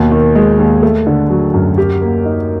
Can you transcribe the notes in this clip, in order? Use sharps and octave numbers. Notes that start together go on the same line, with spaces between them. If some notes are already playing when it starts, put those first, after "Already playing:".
Already playing: D#2 B2
D#3
G#3
D#2
A3
D3
F#3
F#2
G4
A#3
D#4